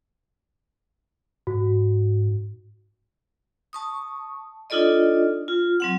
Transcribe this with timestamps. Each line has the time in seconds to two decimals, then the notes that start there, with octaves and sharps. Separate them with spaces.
1.47 G#2 F#4
3.73 A5 C#6 D#6
4.70 D4 D#4 F4 A4 D5 D#5
5.48 F4
5.80 F#3 C4 F#5